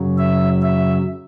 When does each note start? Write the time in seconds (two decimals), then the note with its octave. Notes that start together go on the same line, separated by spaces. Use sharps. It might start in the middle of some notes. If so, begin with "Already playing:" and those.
Already playing: F#2 C#3 F#3
0.18 E5
0.62 E5